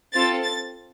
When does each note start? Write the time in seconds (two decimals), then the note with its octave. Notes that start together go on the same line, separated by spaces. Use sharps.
0.13 C4 F4 A4 A6
0.43 A6